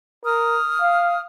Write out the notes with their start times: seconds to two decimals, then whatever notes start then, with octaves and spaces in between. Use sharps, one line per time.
0.24 A#4 D#6 F6
0.81 F5